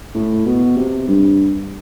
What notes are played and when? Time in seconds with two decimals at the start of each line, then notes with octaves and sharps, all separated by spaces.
0.14 A2
0.46 B2
0.77 C3
1.08 G2